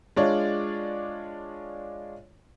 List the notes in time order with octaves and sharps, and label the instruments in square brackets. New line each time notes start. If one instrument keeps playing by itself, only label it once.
[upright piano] G#3 D4 F4 C#5 D5